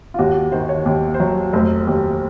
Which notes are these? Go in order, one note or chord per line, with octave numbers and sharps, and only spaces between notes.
F4
D#2 F#4
D#3 C5
C#5
D#2
C5
F#3 C#5
F1 C5
D#2